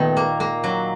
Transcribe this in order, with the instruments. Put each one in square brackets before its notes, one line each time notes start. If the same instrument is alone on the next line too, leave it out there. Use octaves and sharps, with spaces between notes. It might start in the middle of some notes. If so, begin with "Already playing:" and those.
Already playing: [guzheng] A#2 D#3 [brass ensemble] A3 B3
[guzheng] A#3
A#3
F#3